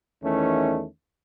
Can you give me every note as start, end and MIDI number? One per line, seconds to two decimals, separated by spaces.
0.23 0.85 40
0.23 0.85 51
0.23 0.85 52
0.23 0.85 57
0.23 0.85 61